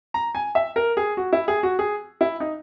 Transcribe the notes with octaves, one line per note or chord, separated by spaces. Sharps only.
A#5
G#5
E5
A#4
G#4
F#4
E4
G#4
F#4
G#4
E4
D#4